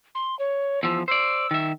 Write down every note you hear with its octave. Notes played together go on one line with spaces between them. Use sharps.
C6
C#5
E2 F3 E6
C5 D5 E6
D#3 E5